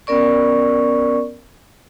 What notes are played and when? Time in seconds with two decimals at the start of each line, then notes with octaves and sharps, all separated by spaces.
0.07 B3 C#4 A#4 D5 C#6